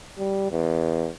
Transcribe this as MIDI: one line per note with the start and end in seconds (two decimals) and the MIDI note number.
0.19 0.47 55
0.51 1.09 40